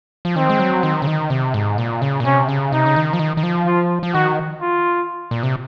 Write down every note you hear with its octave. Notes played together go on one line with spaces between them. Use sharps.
F3
D#3 C4
G#3
F#3
D#3
C#3
D#3
C3
G#2
A#2
C#3
A#2
C3 C#4
C#3
C3 D#4
C#3
D#3
F3
D#3
D#3
F3
F4
F3
D#3 F#4
F4
A#2
C3